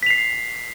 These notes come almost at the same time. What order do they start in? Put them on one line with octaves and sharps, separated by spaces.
B6 F7 C7